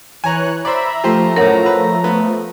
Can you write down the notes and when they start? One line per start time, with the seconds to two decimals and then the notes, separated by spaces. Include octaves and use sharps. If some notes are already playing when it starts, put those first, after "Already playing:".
0.24 E3 C#5 G#5 A#5 F#6
0.65 C5 D5 E5 A#5 B5
1.04 F3 A3 F4 G4 C5
1.36 F#2 A2 A#4 C#5 F#5
1.66 B4 E6
2.04 B3